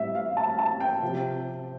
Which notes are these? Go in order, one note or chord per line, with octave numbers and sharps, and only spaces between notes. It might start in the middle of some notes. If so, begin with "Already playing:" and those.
Already playing: A2 G3 C4 E5
F5
A5
A5
G5
C3 F3 C4